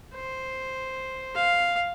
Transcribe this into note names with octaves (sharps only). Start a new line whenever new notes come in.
C5
F5